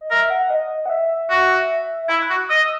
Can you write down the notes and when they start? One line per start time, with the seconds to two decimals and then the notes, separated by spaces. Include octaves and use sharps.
0.01 D#5
0.10 A#4 E5
0.30 F#5
0.50 D#5
0.86 F#5
0.89 E5
1.30 F#4
2.09 E4 B5
2.22 F#6
2.30 F#4
2.43 D#6
2.49 D#5 E6